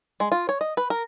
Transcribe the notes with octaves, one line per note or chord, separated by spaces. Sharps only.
G#3
F4
C#5
D#5
B4
A#4